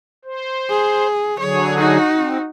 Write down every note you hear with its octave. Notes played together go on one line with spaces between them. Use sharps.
C5
G#4
D3 F#3 G#4 C#5
D#4 F#4
C4